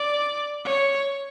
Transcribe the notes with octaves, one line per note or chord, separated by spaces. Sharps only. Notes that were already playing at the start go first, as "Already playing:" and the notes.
Already playing: D5
C#5